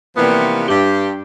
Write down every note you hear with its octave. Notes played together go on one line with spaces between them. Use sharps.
C3 E3 F3 G3 A#3 B3
G2 G4